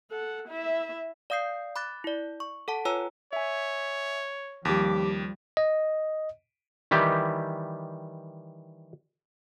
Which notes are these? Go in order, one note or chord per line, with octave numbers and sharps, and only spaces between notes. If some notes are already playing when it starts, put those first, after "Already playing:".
A4 F#5
E4 E5
D5 F5 D#6 G6 C7
B5 D6 F#6 A6
E4 D5
C#6
A4 F#5 A5
F4 B4 C#5 G#5 A#5 E6
C#5 E5 G#5
D#2 F3 G3 G4 D6 B6
D#5
D#3 E3 G3 G4